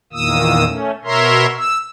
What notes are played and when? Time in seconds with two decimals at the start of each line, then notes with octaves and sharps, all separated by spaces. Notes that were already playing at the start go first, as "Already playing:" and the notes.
0.13 E2 A#2 D#3 A#3 D#6 E6
0.65 A3 C#4
1.05 B2 A#4 C#5 E5 A#5 C6
1.57 E6